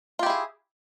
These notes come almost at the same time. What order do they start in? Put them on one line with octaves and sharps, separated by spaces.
F4 G4 E4 G#4